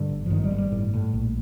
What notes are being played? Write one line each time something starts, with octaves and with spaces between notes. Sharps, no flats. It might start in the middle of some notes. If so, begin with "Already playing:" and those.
Already playing: G2 D3
G1
F3
G1 D#3
G3
G1
G3
A2
A2
A#1